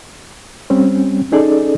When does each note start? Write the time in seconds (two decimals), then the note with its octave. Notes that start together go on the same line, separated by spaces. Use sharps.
0.70 G3 C4 C#4
1.32 C#4 D#4 G#4 A4 D5